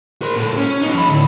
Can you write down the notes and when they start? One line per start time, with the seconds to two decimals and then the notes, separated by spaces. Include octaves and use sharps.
0.22 A#4 C5
0.36 A#2 A4
0.57 C#4
0.82 B3 D#4
0.95 F2 B5
1.09 D2 A2